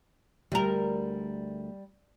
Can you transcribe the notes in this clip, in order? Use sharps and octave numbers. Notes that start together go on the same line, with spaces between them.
D2 G3 A#4